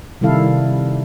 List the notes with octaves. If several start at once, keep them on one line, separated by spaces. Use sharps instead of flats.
C3 D#3 G3 E4 A4 F5